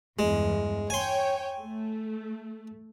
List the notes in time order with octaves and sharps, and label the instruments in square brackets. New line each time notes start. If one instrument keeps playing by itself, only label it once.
[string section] E2 G2 [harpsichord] G#3
[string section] C#5 G5 [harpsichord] G#5 C6
[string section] A3